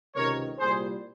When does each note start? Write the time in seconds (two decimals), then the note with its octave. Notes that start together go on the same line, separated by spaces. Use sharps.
0.15 C#2 C3 D#3 A#4 C#5
0.59 C2 A#2 G3 G#4 C5